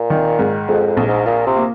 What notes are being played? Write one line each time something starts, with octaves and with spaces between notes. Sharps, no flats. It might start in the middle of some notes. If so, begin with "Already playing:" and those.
Already playing: A#2
D#3
G#2
F2 G#3
F2
A#1
G#2
A#2 F4
C3
A#3